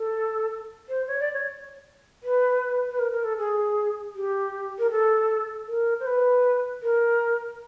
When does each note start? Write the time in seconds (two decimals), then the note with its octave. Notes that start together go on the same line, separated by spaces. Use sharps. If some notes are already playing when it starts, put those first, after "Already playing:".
Already playing: A4
0.89 C5
1.07 C#5
1.20 D5
1.34 C#5
2.23 B4
2.89 B4
2.99 A#4
3.12 A#4
3.24 A4
3.38 G#4
4.15 G4
4.79 A#4
4.91 A4
5.67 A#4
6.00 C5
6.06 B4
6.82 A#4